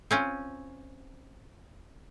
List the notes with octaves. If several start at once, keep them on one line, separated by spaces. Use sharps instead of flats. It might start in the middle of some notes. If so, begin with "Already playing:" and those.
C4 C#4 F4